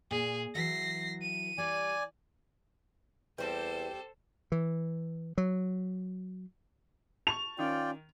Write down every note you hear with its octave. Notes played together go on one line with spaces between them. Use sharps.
A#2 G#4
E3 F#3 A#6 C7
D#7
G3 D5 G#5
E2 G3 C4 A4 C5
E3
F#3
A5 C#6 F7
D#3 C#4 F4 D5 G5